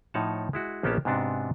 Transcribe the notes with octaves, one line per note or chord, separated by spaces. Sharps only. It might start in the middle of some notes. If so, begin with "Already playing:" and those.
A2 F3 D#4 C#5 F#5 A5
G#3 E4 F#4
A#1 A#3 B3 C#4 G4 A5
G#2 C3 B3 D4 F#4